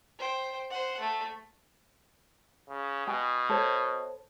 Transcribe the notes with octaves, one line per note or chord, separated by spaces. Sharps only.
C5 G5
C5 F#5
A3
C#3
B2 G5 G#5
A4 C5 C#5